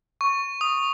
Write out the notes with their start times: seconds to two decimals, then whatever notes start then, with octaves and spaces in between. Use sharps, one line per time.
0.21 C#6
0.61 D#6